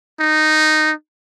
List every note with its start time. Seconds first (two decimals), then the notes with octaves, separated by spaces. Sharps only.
0.20 D#4